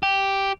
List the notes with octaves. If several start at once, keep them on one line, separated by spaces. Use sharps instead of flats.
G4